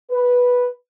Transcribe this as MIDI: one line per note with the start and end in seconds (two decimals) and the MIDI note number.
0.11 0.68 71